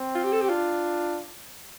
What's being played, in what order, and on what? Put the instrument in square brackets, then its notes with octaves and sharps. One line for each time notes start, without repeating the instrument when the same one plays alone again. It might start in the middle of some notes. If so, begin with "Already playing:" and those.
Already playing: [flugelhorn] C4
[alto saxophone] F4
G4
A4
G4
[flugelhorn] D4 [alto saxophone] F4